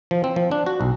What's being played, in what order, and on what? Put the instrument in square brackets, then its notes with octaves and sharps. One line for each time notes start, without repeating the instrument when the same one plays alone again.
[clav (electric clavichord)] F3
C4
F3
D4
F#4
B1